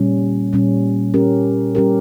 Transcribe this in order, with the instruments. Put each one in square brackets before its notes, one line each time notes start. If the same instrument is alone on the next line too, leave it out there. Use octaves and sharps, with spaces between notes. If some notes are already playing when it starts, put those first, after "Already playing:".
Already playing: [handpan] A#2 G3 C#4
A#2 G3 C#4
G3 C#4 G4 A#4
G3 C#4 G4 A#4